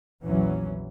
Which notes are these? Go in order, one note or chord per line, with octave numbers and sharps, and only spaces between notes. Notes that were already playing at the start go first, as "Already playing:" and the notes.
A#1 E2 E3 F#3 C#4